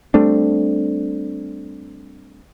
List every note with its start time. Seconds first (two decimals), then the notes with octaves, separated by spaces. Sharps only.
0.14 G3 A3 C4 D4